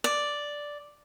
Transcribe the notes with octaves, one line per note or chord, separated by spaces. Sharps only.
D5